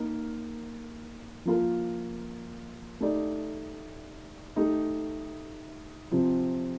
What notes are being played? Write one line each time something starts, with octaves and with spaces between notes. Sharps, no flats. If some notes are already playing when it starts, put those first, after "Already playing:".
Already playing: A#3 D#4 A#4
F3 A#3 F4 A#4
A3 D#4 G4 D5
A3 D#4 G4
C3 F3 C4